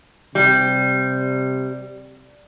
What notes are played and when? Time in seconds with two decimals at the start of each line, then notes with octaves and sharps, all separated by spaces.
0.35 C3 G3